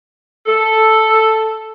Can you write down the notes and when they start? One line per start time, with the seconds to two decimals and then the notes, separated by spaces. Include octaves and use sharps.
0.46 A4